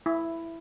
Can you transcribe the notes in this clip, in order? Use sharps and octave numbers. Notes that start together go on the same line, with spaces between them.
E4